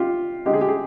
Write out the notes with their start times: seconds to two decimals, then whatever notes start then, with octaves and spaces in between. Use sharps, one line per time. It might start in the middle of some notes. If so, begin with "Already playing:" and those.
Already playing: F4 G4
0.45 D3 G#3 D#4 G4
0.53 G#4
0.61 G4
0.68 G#4